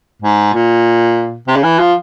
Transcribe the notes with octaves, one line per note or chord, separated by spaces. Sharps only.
G#2
A#2
C3
C#3
E3
F3